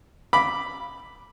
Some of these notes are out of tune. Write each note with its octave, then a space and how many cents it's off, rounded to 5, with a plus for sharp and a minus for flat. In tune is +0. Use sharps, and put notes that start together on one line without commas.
B5 +0 D6 +0